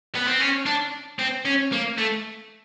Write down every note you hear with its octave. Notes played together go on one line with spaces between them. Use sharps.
B3
C4
C#4
D4
C4
C#4
A#3
A3